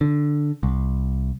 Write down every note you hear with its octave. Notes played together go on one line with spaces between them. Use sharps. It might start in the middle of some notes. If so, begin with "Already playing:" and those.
D3
C2